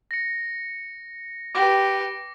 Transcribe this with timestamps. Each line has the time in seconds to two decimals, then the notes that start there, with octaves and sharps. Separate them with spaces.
0.11 A#6 C#7
1.55 G4 B4 D6 A#6